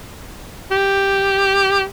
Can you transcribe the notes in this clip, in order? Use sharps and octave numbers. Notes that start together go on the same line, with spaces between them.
G4